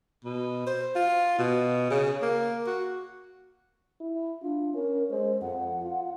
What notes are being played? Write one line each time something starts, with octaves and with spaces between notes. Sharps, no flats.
B2
C5
F4
B2
C#3
A#3
F#4
E4
D4 F4
C#4 A#4
G#3 C5
F2 F#5
F4